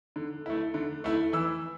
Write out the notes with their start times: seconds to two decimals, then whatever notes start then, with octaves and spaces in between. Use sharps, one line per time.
0.16 D3
0.46 A3 E4
0.74 D3
1.04 A3 E4
1.33 E3 E6